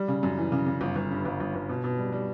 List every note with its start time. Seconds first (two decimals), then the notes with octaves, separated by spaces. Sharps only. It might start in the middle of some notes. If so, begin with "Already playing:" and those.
Already playing: G3
0.08 C#3
0.23 F#2
0.37 E3
0.52 C#3
0.66 C#3
0.81 G1
0.96 G1
1.11 G2
1.25 G1
1.40 G1
1.55 G1
1.69 B2
1.84 B2
1.98 G3
2.12 G3